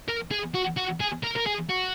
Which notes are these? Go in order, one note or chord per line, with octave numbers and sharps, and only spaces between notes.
A#4
G#4
F#4
F#4
G#4
A#4
A#4
G#4
F#4